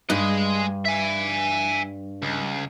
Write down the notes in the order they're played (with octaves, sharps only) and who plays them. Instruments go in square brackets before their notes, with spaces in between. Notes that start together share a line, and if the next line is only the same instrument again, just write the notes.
[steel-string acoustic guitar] G2 [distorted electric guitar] G#3 D#5
[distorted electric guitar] E5 G#5
C#2